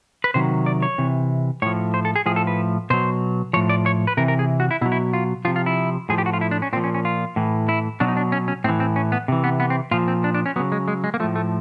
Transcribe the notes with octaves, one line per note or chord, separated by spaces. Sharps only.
B4
C3 D#3 F#3 C5
D5
C#5
C3 E3
A2 F3 C#5
C5
A4
G#4
A2 F3 G#4
A4
B4
B2 F#3 C5
A2 F3 C#5
D5
C#5
B4
C3 E3 A#4
A#4
G#4
F#4
E4
B2 F#3 E4
E4
F4
C3 F3 F4
F4
E4
A2 F3 G#4
G4
F#4
F4
E4
D4
C#4
A#2 F3 C4
C#4
C#4
F4
A2 E3
E4
B2 F#3 D4
D#4
D4
C#4
C#4
A2 E3 C4
C4
C#4
B3
C3 E3
B3
B3
C4
A#2 F3 F4
C4
D4
D4
C#4
C#3 F#3 B3
G#3
G#3
G#3
A#3
A2 F3 A3
A3